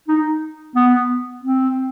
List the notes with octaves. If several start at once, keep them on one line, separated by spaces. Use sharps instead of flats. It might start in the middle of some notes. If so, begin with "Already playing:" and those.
D#4
B3
C4